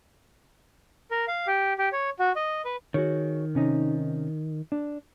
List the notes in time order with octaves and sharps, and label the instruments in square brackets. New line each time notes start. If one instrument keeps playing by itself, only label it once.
[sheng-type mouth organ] A#4
F5
G4
G4
C#5
F#4
D#5
B4
[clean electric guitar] D#3 [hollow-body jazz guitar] F#4 G#4 C#5
[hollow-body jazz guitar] C3 C#4 D#4
D4